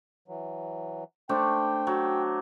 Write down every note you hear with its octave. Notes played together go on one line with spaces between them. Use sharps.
E3 F#3
A3 D4 C5 G5
F#3